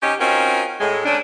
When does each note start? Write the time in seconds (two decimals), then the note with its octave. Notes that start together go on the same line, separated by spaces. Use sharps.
0.03 C3 C#4 D#4 G4
0.19 C4 C#4 D#4 F4 F#4 A#4
0.79 A2 G#3
1.05 A3 A#3 C#4 D4